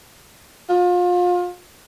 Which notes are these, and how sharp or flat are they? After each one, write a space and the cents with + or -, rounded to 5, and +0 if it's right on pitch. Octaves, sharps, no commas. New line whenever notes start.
F4 +30